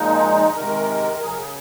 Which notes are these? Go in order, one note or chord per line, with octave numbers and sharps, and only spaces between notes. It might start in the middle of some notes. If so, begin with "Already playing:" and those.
Already playing: A#2 F3 G#3 D#4
C3 D#3 G#3 A#4
A#4
C#3 F#3 G#4
A#4
G#4